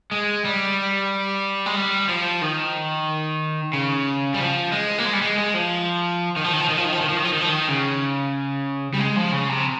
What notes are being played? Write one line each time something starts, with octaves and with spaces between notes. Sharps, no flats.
G#3
G3
G#3
G3
F3
D#3
C#3
G3
F3
G#3
A#3
G#3
G3
G#3
G#3
F3
D#3
F3
D#3
F3
D#3
F3
D#3
F3
D#3
F3
D#3
F3
D#3
F3
D#3
C#3
G3
G#3
F3
C#3
C3